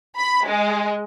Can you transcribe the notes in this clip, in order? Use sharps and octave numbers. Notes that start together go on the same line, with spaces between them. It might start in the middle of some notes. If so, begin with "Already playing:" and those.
B5
G#3